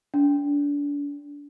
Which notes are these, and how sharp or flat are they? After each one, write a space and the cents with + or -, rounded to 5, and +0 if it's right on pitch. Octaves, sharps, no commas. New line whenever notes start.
D4 -30